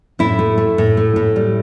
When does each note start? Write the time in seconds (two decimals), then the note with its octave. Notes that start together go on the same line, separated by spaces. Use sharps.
0.19 A2 E4
0.39 A3
0.58 A3
0.78 A2
0.97 A3
1.16 A2
1.36 G3